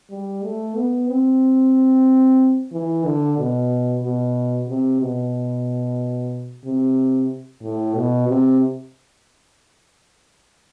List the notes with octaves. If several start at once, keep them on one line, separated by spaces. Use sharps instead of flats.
G3
A3
B3
C4
E3
D3
B2
B2
C3
B2
C3
A2
B2
C3